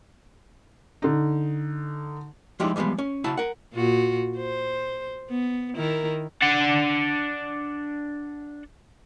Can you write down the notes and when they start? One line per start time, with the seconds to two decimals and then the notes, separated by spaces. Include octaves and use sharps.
1.02 D3 D#4
2.60 F3 G3 G#3 D#4 E4 G4
2.76 E3 F3 G3 G#3 B3
2.99 C#4
3.24 C#3 E4 F#4 A5
3.37 A#4 F#5
3.73 A#2 F4 F#4
4.38 C5
5.30 B3
5.77 D#3 E4 A#4
6.42 D4 F#5